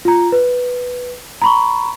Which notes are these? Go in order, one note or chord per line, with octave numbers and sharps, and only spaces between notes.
F4 A#5
B4
A#5 B5 C#6